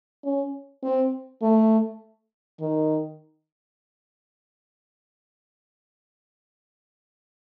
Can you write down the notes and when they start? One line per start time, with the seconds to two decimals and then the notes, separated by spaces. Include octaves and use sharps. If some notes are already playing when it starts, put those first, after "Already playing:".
0.24 C#4
0.83 C4
1.42 A3
2.60 D#3